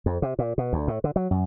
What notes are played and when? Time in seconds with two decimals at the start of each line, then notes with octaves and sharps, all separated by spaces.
0.06 F2
0.22 C3
0.39 A#2
0.58 B2
0.73 D2
0.88 A2
1.04 D3
1.16 F#3
1.31 F#2